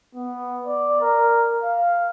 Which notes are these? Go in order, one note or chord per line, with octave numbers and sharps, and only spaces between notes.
B3
D5
A#4
F5